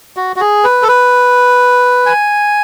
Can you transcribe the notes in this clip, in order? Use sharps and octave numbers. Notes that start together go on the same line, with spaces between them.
F#4
F#4
G#4
B4
A4
B4
G#5